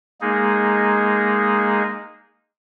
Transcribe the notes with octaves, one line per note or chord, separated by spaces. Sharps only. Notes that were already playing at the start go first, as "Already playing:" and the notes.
G#3 A#3 D#4 G#4